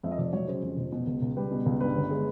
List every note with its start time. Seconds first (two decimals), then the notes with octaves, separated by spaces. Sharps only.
0.03 F2 E5
0.11 D#5
0.18 F1 D5
0.33 F#3 C#5
0.47 C#3 C5
0.63 F2
0.77 F1
0.92 B2
1.07 C#2
1.22 C#2
1.37 G3 B4
1.52 B2
1.66 C#2
1.80 G2 B4
1.96 G1
2.11 G#3